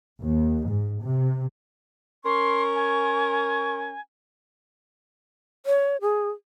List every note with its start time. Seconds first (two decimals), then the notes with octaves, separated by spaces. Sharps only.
0.21 D#2
0.66 G#2
1.02 C3
2.25 C#4 A#4 C6 C#6
2.75 G#5
5.66 C#5
6.01 G#4